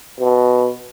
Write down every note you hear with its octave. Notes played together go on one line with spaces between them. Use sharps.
B2